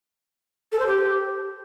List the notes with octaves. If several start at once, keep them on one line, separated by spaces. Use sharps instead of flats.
A4
C5
G4